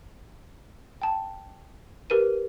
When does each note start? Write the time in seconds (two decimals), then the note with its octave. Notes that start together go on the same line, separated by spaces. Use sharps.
1.02 G5 A5
2.10 G4 A#4 B4 D#7